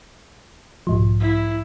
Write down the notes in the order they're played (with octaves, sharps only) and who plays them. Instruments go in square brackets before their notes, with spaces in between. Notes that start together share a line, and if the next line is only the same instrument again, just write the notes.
[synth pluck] B1 G#2 F3
[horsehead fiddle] E4